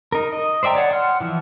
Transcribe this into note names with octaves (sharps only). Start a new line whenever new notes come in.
D#4 A#4
D#5
C5 D5 E5 G5 A#5
C#5 D5 F#5
F#5 C6 F6
E3 F3 E4